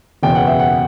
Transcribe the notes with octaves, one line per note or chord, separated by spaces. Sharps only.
F#1 E2 B2 G5
F#5
E5
F#5